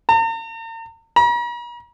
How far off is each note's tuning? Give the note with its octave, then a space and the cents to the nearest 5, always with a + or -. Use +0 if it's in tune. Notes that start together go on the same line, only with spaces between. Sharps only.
A#5 -45
A#5 +45